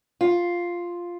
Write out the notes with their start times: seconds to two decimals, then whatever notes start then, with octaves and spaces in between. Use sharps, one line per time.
0.21 F4